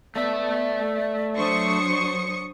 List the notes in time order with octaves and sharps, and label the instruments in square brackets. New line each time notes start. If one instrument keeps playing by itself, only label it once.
[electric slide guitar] A3 E5 [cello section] B3 [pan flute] D5
[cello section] F#3 D4 C5 [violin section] C#6 D#6 C#7